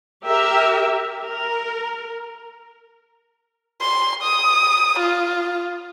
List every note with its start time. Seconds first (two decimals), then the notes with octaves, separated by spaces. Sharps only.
0.25 G4 A#4 E5
1.24 A#4
3.81 C6
4.23 D#6
4.99 F4